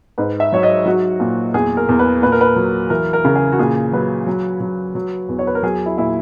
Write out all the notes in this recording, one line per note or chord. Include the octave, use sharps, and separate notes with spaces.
G#2 B4
E5
F#3 C#5
D#5
F#3 F#4
A#2
E2 G#4
A#4
E2
B4
A#2 B4
A#4
B4
F#3
E3 A#4
A#4
C#3 A#4
G#4
F#4
A#2 G#4
F#3 B4
F#3
F#3
F#3
E2
C#5
B4
A#4
F#3 G#4
E4
A#2 E4